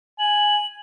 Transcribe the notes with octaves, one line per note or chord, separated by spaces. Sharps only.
G#5 F#7